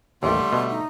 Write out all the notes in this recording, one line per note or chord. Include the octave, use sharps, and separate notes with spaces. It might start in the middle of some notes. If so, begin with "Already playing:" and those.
A1 D#2 D3 G3 A3 C6
B2
D#4